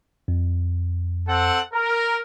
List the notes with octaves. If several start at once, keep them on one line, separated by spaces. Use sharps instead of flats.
F2
C4 A4 F#5
A#4